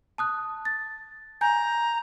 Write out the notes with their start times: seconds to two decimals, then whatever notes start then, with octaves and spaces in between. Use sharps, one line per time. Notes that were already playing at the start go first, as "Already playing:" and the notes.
0.18 A5 D#6 F#6
0.65 A6
1.41 G#5 A#5 G6